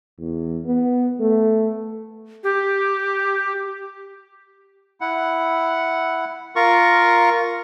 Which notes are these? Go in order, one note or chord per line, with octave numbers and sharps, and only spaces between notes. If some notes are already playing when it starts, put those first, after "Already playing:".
E2
B3
A3
G4
E4 F#5
F4 A#4 C#6